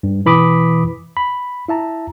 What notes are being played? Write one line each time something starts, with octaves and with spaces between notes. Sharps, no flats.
G2
B2 E3 B5 D6 D#6 B6
B5
E4 E5 A5 A#5